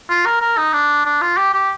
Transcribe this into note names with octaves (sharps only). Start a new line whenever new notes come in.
F4
A#4
A#4
D#4
D4
D4
F4
G4
G4